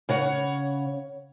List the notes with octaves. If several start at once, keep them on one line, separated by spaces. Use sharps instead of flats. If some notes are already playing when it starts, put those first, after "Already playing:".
C#3 C#5 F#5